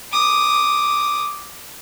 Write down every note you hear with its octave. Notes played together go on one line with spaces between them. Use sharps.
D6 D#6